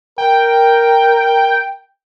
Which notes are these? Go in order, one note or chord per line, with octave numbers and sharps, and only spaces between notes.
A#4 G5